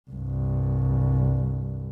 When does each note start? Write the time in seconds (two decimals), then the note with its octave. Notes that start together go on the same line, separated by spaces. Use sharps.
0.11 C2 G2